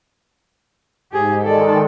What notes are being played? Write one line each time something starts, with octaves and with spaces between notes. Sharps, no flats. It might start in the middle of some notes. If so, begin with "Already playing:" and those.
G#2 G4 G#4
D#3 G#3 A4 D5